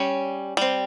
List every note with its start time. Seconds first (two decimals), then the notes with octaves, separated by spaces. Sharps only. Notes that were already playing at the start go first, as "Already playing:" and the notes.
Already playing: G3 C#4 C#5
0.57 G3 C4